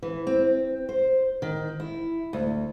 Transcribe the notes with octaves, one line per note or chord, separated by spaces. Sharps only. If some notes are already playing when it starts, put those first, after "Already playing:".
E3
C4
C5
D#3
E4
D2